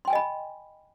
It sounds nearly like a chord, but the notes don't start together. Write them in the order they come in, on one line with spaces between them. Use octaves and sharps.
C6 G5 G#5 D#5 B5